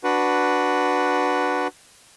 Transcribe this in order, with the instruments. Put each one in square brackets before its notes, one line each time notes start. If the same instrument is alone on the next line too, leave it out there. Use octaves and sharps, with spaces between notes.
[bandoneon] D4 F#4 B4